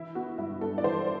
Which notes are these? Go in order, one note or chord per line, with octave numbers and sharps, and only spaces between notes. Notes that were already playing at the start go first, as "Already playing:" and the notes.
Already playing: E3 E4
B3 F#4
G2 E4
G2 A4
D5
E3 C5